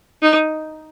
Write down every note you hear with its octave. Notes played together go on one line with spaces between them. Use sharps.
D#4